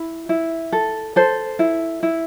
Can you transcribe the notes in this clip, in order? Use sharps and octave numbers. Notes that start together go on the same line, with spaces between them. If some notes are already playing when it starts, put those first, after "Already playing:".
Already playing: E4
E4
A4
A4 C5
E4
E4